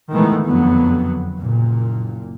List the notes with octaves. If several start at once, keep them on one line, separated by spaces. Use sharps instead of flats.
A2 D#3 E3 G#3 A3 B3
F#1 F2 D3 F#3 B3
F#1 A#2